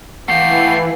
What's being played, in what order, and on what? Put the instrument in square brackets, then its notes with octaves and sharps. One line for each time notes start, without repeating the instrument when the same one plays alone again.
[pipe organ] E3 [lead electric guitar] A3 G4 [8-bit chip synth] F5 F#5 [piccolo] C7